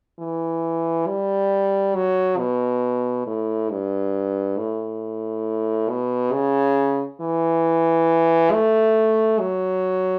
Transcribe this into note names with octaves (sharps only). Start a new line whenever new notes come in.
E3
G3
F#3
B2
A2
G2
A2
B2
C#3
E3
A3
F#3